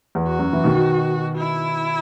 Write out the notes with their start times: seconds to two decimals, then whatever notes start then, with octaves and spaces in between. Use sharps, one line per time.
0.15 E2
0.27 F#4
0.39 F#2
0.53 E3
0.64 B2 D#3
1.38 E4